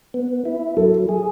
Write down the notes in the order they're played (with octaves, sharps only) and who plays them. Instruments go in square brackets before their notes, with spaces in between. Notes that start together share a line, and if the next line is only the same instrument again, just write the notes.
[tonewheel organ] B3
E4
[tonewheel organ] F#3 [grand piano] A4
[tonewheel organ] G#4